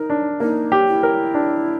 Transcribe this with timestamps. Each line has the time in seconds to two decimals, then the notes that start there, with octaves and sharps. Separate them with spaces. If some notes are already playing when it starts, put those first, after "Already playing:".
Already playing: D#4 A#4
0.10 D4
0.40 A#3 D#4
0.72 G4
0.88 E4
1.03 A#4
1.34 D4